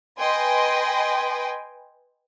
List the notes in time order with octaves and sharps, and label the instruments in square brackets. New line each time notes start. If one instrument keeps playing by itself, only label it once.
[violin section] B4 D#5 G5 G#5 C6